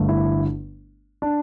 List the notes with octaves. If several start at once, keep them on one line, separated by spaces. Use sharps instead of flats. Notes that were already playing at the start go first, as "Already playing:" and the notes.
Already playing: G1 G2 D3 A3
E4
D4